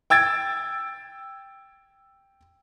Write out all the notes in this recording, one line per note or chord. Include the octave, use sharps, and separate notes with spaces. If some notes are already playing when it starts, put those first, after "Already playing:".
G5 E6 G#6 A6 D7